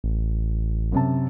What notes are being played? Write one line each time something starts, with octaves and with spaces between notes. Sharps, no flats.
A1
F#2 C3 A5